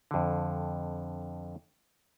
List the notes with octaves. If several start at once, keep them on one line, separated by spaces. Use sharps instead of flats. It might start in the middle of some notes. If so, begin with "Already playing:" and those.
F2 D3